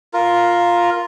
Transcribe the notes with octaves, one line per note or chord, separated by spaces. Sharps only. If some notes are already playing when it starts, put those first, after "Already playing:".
F4 A#4